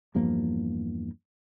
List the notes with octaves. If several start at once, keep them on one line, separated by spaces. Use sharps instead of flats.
E2 G2 F3 A#3